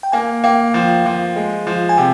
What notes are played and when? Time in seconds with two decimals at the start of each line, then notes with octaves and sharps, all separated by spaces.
0.03 G5
0.12 A#3 G#5
0.44 A#3 G5
0.74 F3
1.06 F3
1.36 G#3
1.67 F3
1.89 G#5
1.98 C3 G5